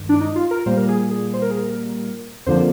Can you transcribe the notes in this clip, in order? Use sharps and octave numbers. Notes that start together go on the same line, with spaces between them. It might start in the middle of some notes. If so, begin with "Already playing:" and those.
Already playing: G2 D#3 G#3
D4
D#4
F4
A#4
A#2 G3 A#3 C5
A#4
G#4
G#4
C5
A#4
G#4
A#4
F2 D3 F3 A#3 C5